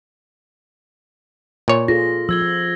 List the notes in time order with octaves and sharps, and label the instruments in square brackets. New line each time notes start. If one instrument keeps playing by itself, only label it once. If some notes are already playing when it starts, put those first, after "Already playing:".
[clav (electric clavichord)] A#2 C#5
[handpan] F4 G#4 A4 [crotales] A#6
[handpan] F3 [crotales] E6 G#6 G7